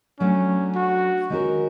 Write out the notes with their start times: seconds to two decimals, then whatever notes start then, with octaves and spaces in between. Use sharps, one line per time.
0.20 F#3 A3 C#4 D4
0.75 F#4
1.30 D#3 G#3 C#4 F#4 A#4